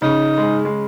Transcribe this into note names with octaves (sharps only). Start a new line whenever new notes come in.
C#3 D#4
G#3 G#4
G#3